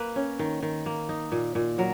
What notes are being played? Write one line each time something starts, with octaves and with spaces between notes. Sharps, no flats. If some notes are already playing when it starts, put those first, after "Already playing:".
Already playing: A#3 B4
C#4
D#3
D#3
A#3
D#4
A#2
A#2
F#3 A#4